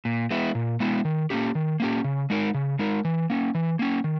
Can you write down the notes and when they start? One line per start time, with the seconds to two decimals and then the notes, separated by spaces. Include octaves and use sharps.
0.05 A#2
0.31 G#3 B3 E4
0.55 A#2
0.80 G#3 B3 E4
1.05 D#3
1.30 A#3 C#4 G4
1.55 D#3
1.80 A#3 C#4 G4
2.04 C#3
2.30 G#3 D#4 A#4
2.54 C#3
2.79 G#3 D#4 A#4
3.05 E3
3.30 A#3 C#4
3.55 E3
3.79 A#3 C#4
4.04 D#3